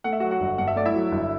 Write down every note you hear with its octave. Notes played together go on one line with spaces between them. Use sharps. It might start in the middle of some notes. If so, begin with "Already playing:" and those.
A3 F#5
E5
F#3 F#4 F#5
F#4 F#5
G1
G2 F#5
E5
A3 D5
E4 E5
F#3
G1